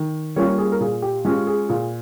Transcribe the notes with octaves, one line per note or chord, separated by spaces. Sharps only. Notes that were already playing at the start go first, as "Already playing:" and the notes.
Already playing: D#3
G3 A#3 C#4 F4 C#5
G#4
A#4
A#2 G#4
G4
G#3 C#4 F4 G4
G#4
A#2 G#4